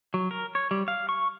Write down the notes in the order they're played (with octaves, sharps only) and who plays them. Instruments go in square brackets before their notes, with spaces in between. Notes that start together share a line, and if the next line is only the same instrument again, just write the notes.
[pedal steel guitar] F#3
A#4
C#5
G3
F5
C#6